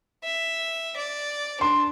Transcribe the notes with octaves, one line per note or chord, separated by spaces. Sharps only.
E5
D5
D4 C6